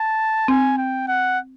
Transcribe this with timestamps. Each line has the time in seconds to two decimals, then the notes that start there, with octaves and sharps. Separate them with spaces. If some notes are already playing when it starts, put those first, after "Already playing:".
Already playing: A5
0.48 C4 G#5
0.78 G5
1.08 F#5